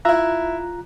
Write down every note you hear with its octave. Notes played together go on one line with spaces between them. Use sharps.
E4 F4 E5 A#5 F#6